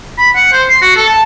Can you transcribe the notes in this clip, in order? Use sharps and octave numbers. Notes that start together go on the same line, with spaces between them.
B5
F#5
C5
C6
F#4
A4
A5